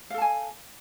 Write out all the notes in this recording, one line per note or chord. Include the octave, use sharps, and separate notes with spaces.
A4 F5 G#5 A5